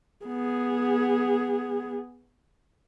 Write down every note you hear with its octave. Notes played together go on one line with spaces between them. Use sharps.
B3 G#4